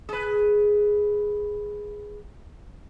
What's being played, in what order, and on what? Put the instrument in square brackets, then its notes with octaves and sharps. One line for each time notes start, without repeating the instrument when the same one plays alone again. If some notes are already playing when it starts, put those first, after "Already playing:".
[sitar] G#4 B4